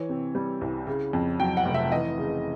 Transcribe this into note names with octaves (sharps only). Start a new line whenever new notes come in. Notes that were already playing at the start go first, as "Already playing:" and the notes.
Already playing: E3 C#5
C3
G3
C2
C#3
F2
F#3 G5
F#5
F1
E5
E3 D#5
C#3